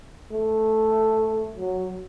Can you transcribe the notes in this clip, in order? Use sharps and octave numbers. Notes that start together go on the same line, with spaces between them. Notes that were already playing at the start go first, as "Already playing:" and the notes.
A3
F#3